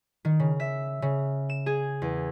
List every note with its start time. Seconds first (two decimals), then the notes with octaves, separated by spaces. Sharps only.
0.25 D#3
0.40 C#3
0.60 E5
1.02 C#3
1.49 E7
1.66 G#4
2.02 E2